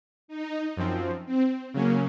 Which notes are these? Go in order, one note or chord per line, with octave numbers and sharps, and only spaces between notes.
D#4
F#2 F3 C4
C4
C#3 F#3 A#3 C#4